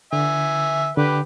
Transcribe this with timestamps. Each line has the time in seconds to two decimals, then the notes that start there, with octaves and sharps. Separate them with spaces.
0.13 D3 E5 G#5
0.97 D3 G4 B4